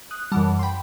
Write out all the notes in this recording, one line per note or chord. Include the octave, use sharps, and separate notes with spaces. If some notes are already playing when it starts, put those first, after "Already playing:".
D#6 F#6
F#2 E3 G3 F#5 A5
C6
G5 B5